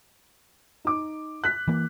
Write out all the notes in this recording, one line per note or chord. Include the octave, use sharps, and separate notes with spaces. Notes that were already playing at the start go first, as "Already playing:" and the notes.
D#4 D6
F#6 B6
E3 A#3